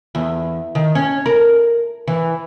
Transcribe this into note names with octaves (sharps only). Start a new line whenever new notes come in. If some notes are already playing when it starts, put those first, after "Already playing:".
E2
D#3
C#4
A#4
E3